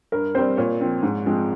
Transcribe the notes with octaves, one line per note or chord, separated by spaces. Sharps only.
G2 A#4
G3 C4 C5
A#2 C#5
F3 C4
G#2
F3 G#3 C4